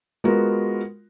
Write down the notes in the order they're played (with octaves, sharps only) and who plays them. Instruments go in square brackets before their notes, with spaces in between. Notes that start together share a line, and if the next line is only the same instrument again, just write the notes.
[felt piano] G#3 B3 F4 F#4 A#4